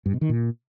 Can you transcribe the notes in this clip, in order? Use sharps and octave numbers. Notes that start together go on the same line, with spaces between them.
G2
B2
D#3
A#2